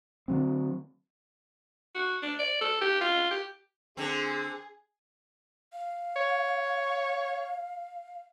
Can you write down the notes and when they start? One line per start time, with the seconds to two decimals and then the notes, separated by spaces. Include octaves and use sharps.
0.28 D3 F#3 C4
1.95 F#4
2.23 D4
2.39 D5
2.61 A4
2.81 G4
3.01 F4
3.31 G4
3.97 D3 C4 G#4
5.73 F5
6.16 C#5